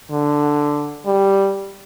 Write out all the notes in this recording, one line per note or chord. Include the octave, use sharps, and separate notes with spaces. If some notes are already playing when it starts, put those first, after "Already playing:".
D3
G3